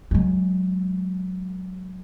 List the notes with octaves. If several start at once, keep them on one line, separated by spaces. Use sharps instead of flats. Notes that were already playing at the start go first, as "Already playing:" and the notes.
F#3 G#3